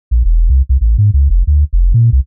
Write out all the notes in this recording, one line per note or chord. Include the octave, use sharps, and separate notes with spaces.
A#1
E1
C2
C2
A1
G#2
C#2
F1
D2
F1
A#2
C2